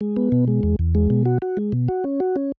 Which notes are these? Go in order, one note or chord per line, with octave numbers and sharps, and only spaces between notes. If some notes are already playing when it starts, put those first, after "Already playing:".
G#3
B3
B2
G#3
E2
E2
G#3
B2
F#4
F#4
G#3
B2
F#4
C#4
F#4
C#4